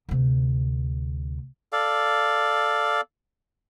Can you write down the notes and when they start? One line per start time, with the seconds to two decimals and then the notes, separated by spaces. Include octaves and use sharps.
0.09 D2 C3
1.73 A4 D5 F5